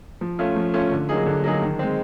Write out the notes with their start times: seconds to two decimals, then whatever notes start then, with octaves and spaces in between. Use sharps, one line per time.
0.21 F3
0.39 A3 C#4 F4
0.56 F3
0.74 A3 C#4 F4
0.92 D3
1.09 F#3 A#3 D#4 G#4
1.26 D3
1.44 F#3 A#3 D#4 G#4
1.62 D#3
1.79 G#3 C4